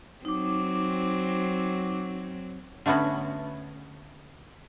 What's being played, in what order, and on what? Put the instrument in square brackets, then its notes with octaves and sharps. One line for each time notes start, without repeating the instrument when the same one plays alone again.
[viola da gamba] F#3 C4 [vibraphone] D#4 D6
[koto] D3 A3 B3 C#4 F#4